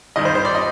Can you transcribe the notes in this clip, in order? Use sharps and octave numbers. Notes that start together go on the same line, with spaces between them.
G2 D#3 G3 D#5
C5
C5
D5
D#5